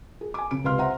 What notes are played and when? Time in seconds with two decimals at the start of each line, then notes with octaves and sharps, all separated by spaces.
0.21 G#4
0.34 G#5 D6
0.51 C#3 D7
0.64 C#2 C3 B4 F5 C6 F6
0.78 C5 E5 F#5 A#5 C6